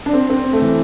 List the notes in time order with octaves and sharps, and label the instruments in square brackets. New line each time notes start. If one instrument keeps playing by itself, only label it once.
[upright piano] D4
C4
C4
A3
E3